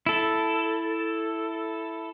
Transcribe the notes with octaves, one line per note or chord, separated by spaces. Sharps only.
E4 A4